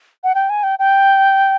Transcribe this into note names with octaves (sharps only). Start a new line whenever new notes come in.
F#5
G5
G#5
G5
G5